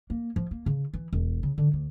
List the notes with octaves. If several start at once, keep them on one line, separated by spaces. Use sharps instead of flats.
A#3
F3
A#3
C#3
E3
E1
C#3
D3
D2